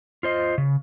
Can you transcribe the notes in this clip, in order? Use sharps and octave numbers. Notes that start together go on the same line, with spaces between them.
F4 C5 D#5
C#3